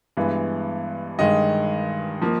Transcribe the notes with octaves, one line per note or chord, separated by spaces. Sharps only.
G2 E3 G#3 B3
G2 D#3 G#3 D#5
F3 A#3